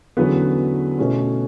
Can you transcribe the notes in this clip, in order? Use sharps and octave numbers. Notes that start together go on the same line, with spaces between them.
E2 D3 F#3 B3 C#4 B4
B2 A3 C#4